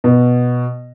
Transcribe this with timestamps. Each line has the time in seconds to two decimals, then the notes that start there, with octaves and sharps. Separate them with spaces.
0.04 B2